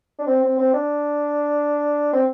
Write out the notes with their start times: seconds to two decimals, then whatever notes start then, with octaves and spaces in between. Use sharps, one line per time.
0.19 D4
0.27 C4
0.43 C4
0.58 C4
0.74 D4
2.13 C4